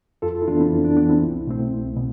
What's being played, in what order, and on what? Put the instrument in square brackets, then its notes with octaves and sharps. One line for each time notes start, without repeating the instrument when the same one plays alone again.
[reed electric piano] F2 F4 A4
F4 A4
E4
E3 B3 D4 F4
C4 E4
F2
D4
E3 B3 D4
C4 E4
C2
B2 A3 C4
C2
B2